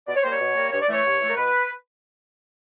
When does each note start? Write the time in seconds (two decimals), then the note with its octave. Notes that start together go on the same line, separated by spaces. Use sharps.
0.07 B2 D5
0.15 C#5
0.23 G3 A#3 C5
0.31 C#5
0.40 B2
0.56 G3 A#3
0.72 G2 C#5
0.82 D5
0.88 E3 A3 C#5
1.04 G2
1.20 E3 A3
1.29 A#4
1.36 B2 B4